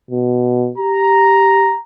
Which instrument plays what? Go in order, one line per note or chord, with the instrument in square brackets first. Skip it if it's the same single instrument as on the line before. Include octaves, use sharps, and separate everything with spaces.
[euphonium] B2
[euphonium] G4 [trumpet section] A#5